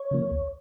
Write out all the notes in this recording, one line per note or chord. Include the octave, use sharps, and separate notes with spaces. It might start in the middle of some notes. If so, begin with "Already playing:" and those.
Already playing: C#5
C#3 F3 A#3
D2